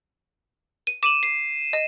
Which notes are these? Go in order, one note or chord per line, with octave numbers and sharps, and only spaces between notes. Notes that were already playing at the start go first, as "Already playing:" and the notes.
D#7
D6 D#7 E7 F#7
C7 E7
D#5